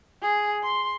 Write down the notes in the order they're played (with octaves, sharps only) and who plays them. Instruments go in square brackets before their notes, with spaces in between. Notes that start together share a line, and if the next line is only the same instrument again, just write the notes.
[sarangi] G#4
C6